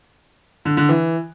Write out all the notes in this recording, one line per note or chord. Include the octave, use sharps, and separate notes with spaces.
D3
D3
E3